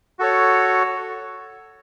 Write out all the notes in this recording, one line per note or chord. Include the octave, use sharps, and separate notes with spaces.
F#4 A4 C#5